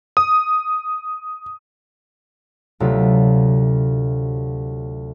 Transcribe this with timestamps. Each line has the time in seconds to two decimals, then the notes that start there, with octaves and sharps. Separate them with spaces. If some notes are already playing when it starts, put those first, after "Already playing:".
0.17 D#6
2.80 D2 C3 F#3 D4 F4 B6